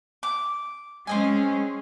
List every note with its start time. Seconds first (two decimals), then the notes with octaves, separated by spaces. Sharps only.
0.23 D6
1.07 G#3 C4 C#4 D#5 G#5